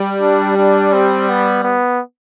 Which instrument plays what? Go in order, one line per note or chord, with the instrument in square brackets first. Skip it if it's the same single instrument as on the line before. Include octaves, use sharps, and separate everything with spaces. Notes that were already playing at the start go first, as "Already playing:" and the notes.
Already playing: [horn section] G3
[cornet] D4
D4
C4
B3
B3